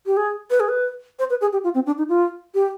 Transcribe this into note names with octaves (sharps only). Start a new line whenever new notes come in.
G4
G#4
B4
G#4
B4
C5
B4
G#4
G4
F4
C4
D4
D#4
F4
G4